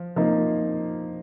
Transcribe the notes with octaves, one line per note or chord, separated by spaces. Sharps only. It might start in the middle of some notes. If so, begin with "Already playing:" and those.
Already playing: F3
F3 A#3 D#4